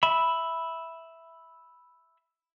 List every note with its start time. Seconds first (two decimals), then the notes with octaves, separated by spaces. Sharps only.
0.03 E5 B5